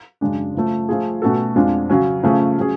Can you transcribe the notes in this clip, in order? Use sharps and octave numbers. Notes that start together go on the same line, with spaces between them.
F#2 C#3 G#3 D4
C#3 F3 A3
F3 A3 F4 G#4
B2 A3 C#4 F#4 A4
F2 F3 G#3 D4 F4
C#3 F#3 C#4
C#3 F3 A3 C#4 G#4
F#3 C#4 G#4